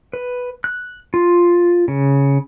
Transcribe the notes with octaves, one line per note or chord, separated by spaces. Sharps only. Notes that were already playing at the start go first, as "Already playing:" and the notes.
B4
F#6
F4
C#3